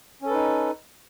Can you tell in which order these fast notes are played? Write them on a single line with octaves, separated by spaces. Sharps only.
C#4 A4 B4 D#4